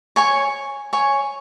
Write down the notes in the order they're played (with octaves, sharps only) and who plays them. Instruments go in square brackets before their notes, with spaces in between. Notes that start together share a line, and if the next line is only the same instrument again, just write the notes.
[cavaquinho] C#5 G#5 C#6
C#5 G#5 C#6